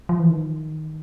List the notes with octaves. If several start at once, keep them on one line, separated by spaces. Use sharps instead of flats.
F3
E3
D#3